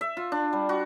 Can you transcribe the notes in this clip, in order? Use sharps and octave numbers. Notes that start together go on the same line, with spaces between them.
E5
F4
D4
G3
F#4